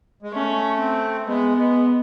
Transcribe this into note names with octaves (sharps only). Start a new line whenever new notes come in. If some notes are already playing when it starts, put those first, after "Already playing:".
G#3
A3 C#4
C4
G#3 B3
G#3 B3